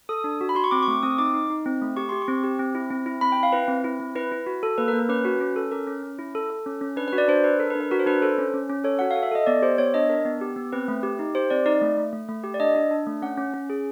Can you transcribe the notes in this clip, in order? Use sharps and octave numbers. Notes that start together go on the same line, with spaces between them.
A4 D#6
D4
F#4
B5
F#4 C6
C#6
C4 D6
C#6
A3 D6
C4 D#6
D#4 D6
D#4
D#4
C4
A3
G4 C#6
G4 C6
C#6
C4
G4
C4
E4
C4
E4
C4 B5
G5
E4
F5
E4 B4
C4
E4
C4
E4 B4
E4
F#4
A4
A#3 B4
A#4
A#3
A#4
C#4 B4
F#4 B4
C#4
A4
C#4 A#4
C#4
C#4
E4
A4
A4
C#4
C#4
D4 B4
B4
F#4
D5
D4 C5
D4 B4
A4 A#4
B4
D4
B4
F#4 A#4
C5
D4 B4
A4 C5
C#4
C#4
C#4
A4 C#5
F#4 F#5
F5
A4
E5
A4 D#5
B3 D5
G4 C5
B3 C#5
D4 D#5
D4 A#4
B3
G4
B3
C4 B4
A3
G4
D#4
G4 C5
C4 D5
D#4 D5
A3
A3
A3
A3
G4
D5
D4 D#5
D4
D4
A3
C#4 F#5
C#4
C#4
G#4